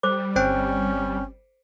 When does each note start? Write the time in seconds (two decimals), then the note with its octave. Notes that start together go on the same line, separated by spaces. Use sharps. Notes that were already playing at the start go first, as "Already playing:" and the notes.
0.03 G3 A4 C5 D6
0.36 G1 C4 C#4 C5 G5